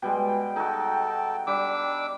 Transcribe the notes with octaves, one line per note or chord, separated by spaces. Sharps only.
B2 G3 G#3 G5
D#4 F#4 A4
G3 D4 D6 E6